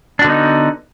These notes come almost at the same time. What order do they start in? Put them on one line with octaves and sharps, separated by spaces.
D4 F#4 D3 B3 D#4